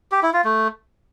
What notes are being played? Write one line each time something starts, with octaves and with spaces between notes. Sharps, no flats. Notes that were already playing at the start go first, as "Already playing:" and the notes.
G4
E4
F4
A3